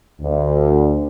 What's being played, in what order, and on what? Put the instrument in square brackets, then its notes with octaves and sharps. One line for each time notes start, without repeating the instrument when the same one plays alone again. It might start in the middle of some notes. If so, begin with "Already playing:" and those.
[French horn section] D2